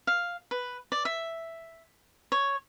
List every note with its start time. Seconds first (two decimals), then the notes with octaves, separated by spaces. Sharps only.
0.07 F5
0.51 B4
0.92 D5
1.05 E5
2.32 C#5